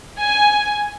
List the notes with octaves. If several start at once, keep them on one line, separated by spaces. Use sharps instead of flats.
G#5